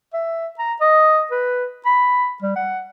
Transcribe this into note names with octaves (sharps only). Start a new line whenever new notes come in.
E5
A#5
D#5
B4
B5
G3
F#5